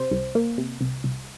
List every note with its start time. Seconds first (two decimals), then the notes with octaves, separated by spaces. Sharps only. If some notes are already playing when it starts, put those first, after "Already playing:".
Already playing: C3 C5
0.11 C2
0.35 A#3
0.58 C3
0.81 C2
1.04 C2